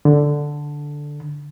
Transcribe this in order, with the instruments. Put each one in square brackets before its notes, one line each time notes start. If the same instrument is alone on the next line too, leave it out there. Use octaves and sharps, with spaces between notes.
[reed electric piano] D3